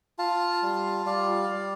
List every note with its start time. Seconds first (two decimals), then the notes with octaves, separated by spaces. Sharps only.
0.18 F4 F5 A5
0.63 G3
1.06 G3 D5 F5
1.50 G3